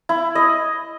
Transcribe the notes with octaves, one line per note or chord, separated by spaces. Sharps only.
E4
D#5